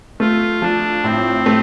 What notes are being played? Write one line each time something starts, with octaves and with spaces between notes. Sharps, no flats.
A3 F4
F3 D4
A2 C4
A3